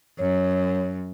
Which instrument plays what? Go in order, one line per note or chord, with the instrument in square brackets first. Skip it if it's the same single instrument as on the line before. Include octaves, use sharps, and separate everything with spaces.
[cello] F#2 [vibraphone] C#5